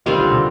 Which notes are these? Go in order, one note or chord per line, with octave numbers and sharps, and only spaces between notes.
D#3 G3 C4 F4
D3
C3